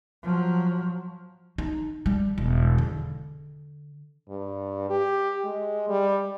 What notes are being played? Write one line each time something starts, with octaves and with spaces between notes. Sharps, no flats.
F3 F#3
D#4
G3
E1
D3
G2
G4
G#3
G3